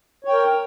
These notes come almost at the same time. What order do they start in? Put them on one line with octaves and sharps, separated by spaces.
C#5 G5 A#4